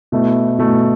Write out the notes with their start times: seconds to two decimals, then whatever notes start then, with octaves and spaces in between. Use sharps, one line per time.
0.12 B2 A3 E4
0.59 B2 A3 E4